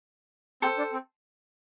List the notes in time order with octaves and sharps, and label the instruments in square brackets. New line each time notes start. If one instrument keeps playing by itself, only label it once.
[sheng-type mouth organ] C4 [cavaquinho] A4 C5 G5
[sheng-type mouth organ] D4
C4